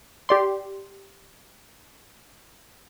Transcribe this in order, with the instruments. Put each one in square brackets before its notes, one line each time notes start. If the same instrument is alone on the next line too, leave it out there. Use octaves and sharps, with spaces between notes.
[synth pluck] G4 D5 C6